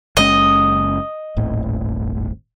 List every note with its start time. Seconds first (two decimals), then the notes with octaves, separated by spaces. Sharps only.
0.17 F#1 G#3 C#4 D#5
1.37 D#1 G#1 A2